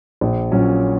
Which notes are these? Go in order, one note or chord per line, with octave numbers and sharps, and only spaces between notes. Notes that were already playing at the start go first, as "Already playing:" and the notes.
A#1
A#2 F#3 C#4